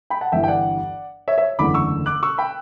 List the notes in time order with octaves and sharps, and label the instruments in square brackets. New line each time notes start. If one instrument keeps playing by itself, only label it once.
[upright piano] G5 B5
F#5 A5
[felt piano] G1 G2 E3 [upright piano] E5 G5
[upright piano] G5
D5 F#5
C#5 E5
C#5 E5
[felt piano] F#1 E2 D3 A3 E4 [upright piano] B5 D6
[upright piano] C#6 E6
D6 F#6
C#6 E6
G5 B5